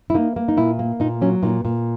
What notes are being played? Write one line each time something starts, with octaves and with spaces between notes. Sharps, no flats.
E4
A#3 D#4
A#3
D#4
A#2 E4
A#3
A#2 D#4
F#3 C#4
A#2 D#4
A#2